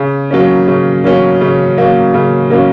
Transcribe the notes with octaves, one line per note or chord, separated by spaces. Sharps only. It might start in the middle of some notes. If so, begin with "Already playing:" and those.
Already playing: C#3
F#3 A#3 C#4
C#3
F#3 A#3 C#4
C#3
F#3 A#3 C#4
C#3
F#3 A#3 C#4